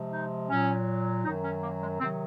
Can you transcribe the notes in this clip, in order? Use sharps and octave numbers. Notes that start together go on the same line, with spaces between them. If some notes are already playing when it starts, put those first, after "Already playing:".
Already playing: C3 F3 G#3
D#4
A#2 F#3 C#4
F#2 D#3 F#3 D#4
C#4
A#3
G#3
C3 D#3 F#3 C4